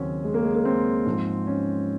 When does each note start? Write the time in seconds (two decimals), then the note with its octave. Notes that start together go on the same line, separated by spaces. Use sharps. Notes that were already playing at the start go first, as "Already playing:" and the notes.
Already playing: D#2 C#3 F#3 C4 C#4
0.24 G#3
0.34 A#3
0.45 G#3
0.55 A#3
0.65 C4
1.06 G#2 F3
1.47 C#4